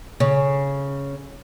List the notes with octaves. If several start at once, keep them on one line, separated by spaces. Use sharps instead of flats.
C#3